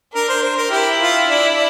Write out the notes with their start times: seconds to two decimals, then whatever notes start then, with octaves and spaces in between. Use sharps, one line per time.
0.14 D4 A#4
0.29 C5
0.43 C5
0.57 A#4
0.70 E4 G4
0.99 F4
1.27 D4
1.54 D4